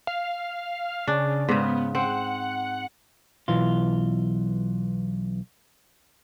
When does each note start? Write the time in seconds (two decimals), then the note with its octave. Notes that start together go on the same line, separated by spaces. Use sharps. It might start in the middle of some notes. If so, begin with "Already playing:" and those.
0.07 F5
1.07 C#3 D4
1.49 G#2 C#3 B3
1.95 C4 F#5
3.48 B1 E3 F4